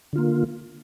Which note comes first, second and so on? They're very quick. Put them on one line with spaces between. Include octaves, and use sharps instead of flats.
D3 F4 A#3